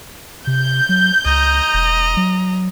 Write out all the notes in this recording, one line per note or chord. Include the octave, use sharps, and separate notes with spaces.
C3 G6
F#3
C#2 D#5 A#5
E1
F#3